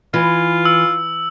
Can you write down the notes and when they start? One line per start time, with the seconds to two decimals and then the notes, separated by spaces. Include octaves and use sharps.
0.14 E3 F4
0.65 E6